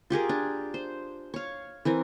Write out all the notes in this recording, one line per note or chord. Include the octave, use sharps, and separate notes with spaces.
F4 G4 G#4 A#4
D4
C5
C#5 F5
E3 C4 A#4